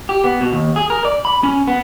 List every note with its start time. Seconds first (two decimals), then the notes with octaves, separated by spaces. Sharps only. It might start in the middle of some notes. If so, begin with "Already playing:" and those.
0.09 G4
0.24 B3
0.41 B2
0.53 D#2
0.76 G#4
0.90 A#4
1.05 D5
1.25 B5
1.43 C#4
1.68 B3